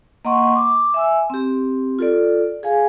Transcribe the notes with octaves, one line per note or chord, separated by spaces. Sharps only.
A#3 D#5 F#5 C6 C#6
D6
E5 G#5 E6
C4 G4
F4 A4 D5
G#4 F5 G#5